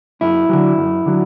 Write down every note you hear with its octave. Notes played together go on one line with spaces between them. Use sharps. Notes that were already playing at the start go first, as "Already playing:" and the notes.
F#2 E4
D3 F#3
F#2
D3 F#3